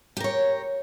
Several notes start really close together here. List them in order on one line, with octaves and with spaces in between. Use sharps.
G4 A#4 C#5